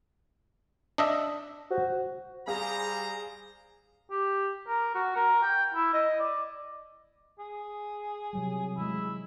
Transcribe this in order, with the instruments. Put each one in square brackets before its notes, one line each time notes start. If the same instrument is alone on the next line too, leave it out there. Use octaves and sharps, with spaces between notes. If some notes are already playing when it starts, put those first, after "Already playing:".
[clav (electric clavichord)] D4 D#5 E5
[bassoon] F#4 [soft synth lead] C5
[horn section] G3 C5 A#5 [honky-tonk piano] G#4 F5
[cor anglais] G4
A#4
F#4
A#4
G5
E4
D#5
D5
G#4
[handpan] C3 F#3 G3
[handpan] E3 G#3 [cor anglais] E4